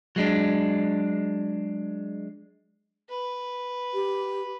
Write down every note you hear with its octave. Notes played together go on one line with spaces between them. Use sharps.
F#3 G#3 D4
B4
G4